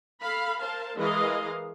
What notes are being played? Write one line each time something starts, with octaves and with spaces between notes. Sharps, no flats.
A4 F5 B5
A#4 C5 F5 A5
E3 G#3 A#4 D#5 F5